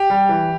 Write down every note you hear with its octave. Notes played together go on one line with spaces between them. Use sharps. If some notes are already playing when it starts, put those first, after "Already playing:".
Already playing: G4
G3
E3